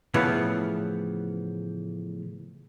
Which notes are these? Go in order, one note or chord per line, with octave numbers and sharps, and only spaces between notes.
A2 C#3 E3 F3 B3